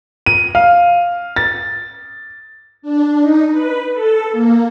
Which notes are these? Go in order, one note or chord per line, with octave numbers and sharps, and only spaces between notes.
D#7
F5
A6
D4
D#4
B4
A4
A#3